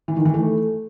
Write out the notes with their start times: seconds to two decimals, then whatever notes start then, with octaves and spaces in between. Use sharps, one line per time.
0.08 E3
0.17 D#3
0.25 E3
0.34 A3